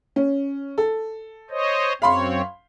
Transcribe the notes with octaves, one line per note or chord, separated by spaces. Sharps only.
C#4
A4
C5 C#5 D#5
F#2 C4 C#5 F5 B5 C6